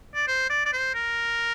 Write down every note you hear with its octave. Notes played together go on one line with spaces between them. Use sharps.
D5
C5
D5
D5
C5
A#4